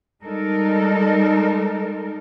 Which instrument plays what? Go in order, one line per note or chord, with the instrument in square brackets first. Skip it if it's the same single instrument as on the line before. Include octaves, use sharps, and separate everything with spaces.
[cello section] G3 G#3 D#4 A4 A#4